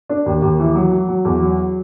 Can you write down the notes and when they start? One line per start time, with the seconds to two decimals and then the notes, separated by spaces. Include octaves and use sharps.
0.09 D4
0.26 D#2
0.42 D#2
0.59 E3
0.75 F#3
0.91 F#3
1.08 F#3
1.25 E2
1.42 F#3